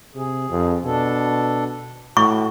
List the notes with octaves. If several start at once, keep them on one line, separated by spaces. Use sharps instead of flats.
C3 G#4
F2
B2 D4 A4
A2 F#4 C#6